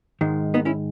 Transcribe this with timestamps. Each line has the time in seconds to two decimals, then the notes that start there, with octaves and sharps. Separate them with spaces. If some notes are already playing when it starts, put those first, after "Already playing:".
0.21 G#2 D#3 G#3
0.54 B3 D#4
0.65 C#4 E4